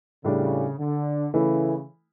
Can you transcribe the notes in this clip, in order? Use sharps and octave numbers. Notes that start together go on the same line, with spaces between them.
A2 C#3 G3 D4
D3
C#3 E3 A3 E4